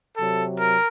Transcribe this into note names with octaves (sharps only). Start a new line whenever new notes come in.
C3 F#3 A4
A#4